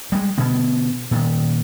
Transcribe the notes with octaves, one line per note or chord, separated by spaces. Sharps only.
G3 G#3
B2 D3 B3
A#2 D#3